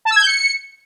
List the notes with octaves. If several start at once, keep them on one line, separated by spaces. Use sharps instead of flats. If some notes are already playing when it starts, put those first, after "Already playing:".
A5
E6
G#6
G6
C#7